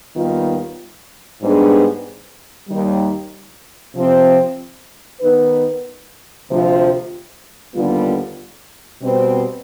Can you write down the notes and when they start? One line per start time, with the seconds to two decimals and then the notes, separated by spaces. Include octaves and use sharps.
0.15 D#2 D#3 G3 B3 F4
1.41 G#2 G3 B3 D4 G#4
2.68 D#2 D#3 G3
3.94 C3 F3 C4
5.21 D#3 B3 D#4 B4
6.48 D2 C3 F3
7.74 D#2 D3 G3 B3 F4
9.00 B2 G3 C4